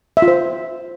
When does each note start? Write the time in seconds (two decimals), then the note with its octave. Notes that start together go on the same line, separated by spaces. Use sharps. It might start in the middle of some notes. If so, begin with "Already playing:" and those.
0.17 E5
0.22 F4
0.28 C5